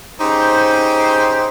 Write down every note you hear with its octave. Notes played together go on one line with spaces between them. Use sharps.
C#3 D#4 G4 C5